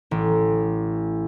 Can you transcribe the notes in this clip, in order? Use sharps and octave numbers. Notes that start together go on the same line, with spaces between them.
A1